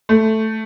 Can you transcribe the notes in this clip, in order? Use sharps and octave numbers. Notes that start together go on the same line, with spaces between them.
A3